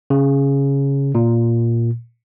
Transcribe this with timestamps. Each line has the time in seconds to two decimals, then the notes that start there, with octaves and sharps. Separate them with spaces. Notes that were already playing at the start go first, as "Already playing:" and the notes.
0.10 C#3
1.15 A#2